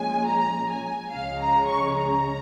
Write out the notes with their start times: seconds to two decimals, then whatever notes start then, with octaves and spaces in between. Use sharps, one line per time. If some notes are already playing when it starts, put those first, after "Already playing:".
Already playing: A#2 F3 G#3 C#4 G#5
0.26 A#5
0.68 G#5
1.11 C#2 C#3 F3 G#3 C#4 F5
1.39 A#5
1.68 C#6
1.96 A#5